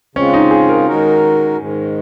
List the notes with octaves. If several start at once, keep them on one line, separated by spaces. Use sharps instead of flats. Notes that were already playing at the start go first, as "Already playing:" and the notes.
C#3 G#3 C4 C#4 F4
D#4
G#4
A#4
D#3 G#3 D#4 F#4 A#4
G#2 D#3 G#3